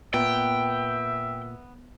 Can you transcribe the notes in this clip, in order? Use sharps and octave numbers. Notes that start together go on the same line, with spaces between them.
A#2 B3 E5 G5